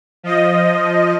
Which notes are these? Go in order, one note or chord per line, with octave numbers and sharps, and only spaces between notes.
F3 D#5